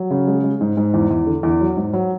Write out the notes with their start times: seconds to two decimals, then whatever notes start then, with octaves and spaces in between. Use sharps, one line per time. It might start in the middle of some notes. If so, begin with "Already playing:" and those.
Already playing: F#3
0.11 C#3
0.27 G#3
0.44 G#3
0.61 G#2
0.77 G#2
0.94 E2
1.11 E2
1.27 D3
1.43 E2
1.61 F#3
1.77 G#2
1.93 F#3